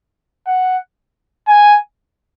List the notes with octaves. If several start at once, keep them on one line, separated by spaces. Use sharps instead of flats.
F#5
G#5